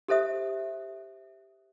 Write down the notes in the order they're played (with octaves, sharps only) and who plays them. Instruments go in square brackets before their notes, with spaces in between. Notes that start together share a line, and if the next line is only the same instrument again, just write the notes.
[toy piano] G4 A4 C5 E5 D#6